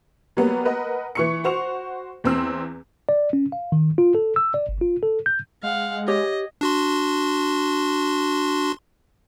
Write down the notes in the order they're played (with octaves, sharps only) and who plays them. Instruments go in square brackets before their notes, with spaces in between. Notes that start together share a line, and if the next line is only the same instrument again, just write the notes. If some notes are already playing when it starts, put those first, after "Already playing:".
[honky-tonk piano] F#3 G3 A#3 B3
A#4 B4 D#5 F#5
E3 C#6 C#7
F#4 C5 C#6 F7
E2 C4 E6
[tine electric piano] D5
C#4
F5
D#3
F4
A4
E6
D5
G1
F4
A4
G6
[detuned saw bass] G#3 [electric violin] F5 F#5
[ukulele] G4 C#5 [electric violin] D#5
[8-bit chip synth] D4 F#4 C6